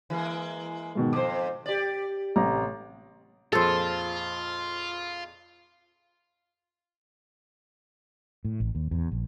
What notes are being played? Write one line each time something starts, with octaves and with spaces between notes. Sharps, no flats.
E3 G#3 A#3
G#2 B2 D#3
F2 C5 D6
G4 D5
A1 C3 A#5
F2 A#2 F4 G#4 A4 C5
A2
A1
D#2
E2
A#1